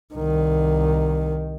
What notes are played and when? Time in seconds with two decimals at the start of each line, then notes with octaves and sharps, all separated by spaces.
0.14 C2 D#3